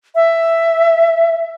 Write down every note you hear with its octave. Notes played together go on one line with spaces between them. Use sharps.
E5